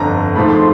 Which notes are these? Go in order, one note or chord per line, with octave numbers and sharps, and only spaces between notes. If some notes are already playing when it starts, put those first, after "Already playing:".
Already playing: G1 F2 D3 A#5
G#1 G#2 F3 A3 B5
C6